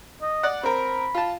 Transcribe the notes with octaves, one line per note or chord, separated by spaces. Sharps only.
D#5
D5 F#5
C4 A#4 B5
F4 A5